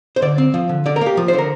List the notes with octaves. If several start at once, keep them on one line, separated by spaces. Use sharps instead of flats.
C5
D3 D5
C4
F3
D3
D3 D5
A#4
A#3
G4
F3
C5
D3
A#4